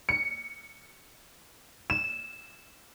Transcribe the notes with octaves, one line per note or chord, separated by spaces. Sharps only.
C#7
E7